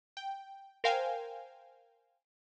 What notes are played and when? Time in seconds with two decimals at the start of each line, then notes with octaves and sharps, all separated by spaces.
0.17 G5
0.84 A#4 C5 F5 G5 G#5